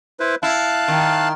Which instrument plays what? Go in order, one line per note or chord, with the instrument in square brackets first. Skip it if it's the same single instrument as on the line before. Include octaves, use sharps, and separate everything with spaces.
[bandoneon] E4 B4 C5
[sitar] E4 [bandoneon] F5 A5 F#6
[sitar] D#3